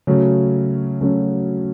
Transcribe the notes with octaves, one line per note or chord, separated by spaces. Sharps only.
C#3 F#3 A3 C#4 F#4
C#3 F#3 A3 C#4 F#4